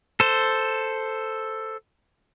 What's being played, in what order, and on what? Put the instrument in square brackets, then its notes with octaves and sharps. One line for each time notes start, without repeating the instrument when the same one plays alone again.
[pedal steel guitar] A4 C5